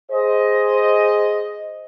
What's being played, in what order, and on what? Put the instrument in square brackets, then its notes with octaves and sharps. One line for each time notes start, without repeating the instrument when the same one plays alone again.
[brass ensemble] G#4 C5 D#5